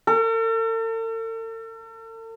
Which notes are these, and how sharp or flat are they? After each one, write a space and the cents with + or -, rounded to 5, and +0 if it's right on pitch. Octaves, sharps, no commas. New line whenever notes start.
A4 +45